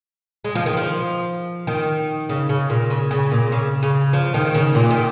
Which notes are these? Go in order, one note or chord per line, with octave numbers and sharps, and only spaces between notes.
G#3
F3
D#3
F3
D#3
C#3
C#3
A#2
C#3
C#3
A#2
C#3
C#3
F3
D#3
C#3
A#2
D#3